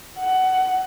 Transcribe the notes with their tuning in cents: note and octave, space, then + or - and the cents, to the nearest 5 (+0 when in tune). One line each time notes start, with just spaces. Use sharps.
F#5 +20